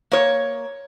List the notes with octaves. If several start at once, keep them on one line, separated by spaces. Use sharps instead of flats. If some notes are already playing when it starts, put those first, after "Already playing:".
A#3 C#5